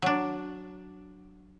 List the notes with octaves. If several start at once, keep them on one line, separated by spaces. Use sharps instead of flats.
F#3 D4